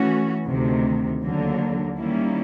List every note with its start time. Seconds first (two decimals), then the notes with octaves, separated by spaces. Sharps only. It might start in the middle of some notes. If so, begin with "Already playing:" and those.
Already playing: E3 A3 C#4 F#4
0.46 D2 C3 D#3
1.22 D#2 D3 F#3 A#3
1.96 D#3 G3 A#3 C#4 E4